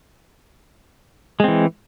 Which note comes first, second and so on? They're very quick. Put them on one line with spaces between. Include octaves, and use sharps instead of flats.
G#3 C4 E3